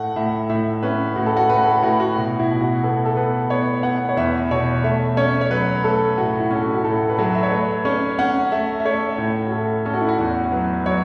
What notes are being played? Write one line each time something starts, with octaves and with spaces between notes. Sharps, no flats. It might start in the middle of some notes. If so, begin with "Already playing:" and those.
Already playing: A2 A3 F#5
A2 E5
A2 E5
C#4 B4
A2 F#4
A4
F#4
A2 B4
A4
A2 F#4
F#4
B2 F#4
E4
B2
F#4
B3 A4
A4
B3 B4
B3 C#5
B3 F#5
C#5
E2 E5
B2 C#5
A3 E5
C#4 C#5
C#5
F#3 B4
A3 A4
A2 F#4
E4
C#4 A4
F#4
F#4
A2 A4
B4
F#3 A4
E5
C#5
A3 B4
C#4 C#5
C#4 F#5
A3 E5
E5
A3 C#5
A2
F#4
A2 A4
C#4 A4
F#4
E4
F#4
E2 F#4
F#3 B4
F#3 C#5